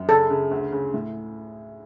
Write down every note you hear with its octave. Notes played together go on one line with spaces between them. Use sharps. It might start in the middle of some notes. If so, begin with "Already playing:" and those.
Already playing: F#2
C#3 A4
C#3
D2
C#3
A2